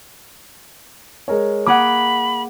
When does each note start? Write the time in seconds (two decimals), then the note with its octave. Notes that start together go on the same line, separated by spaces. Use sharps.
1.28 G#3 A#4 C#5
1.67 A#3 G#4 F#5 B5 D6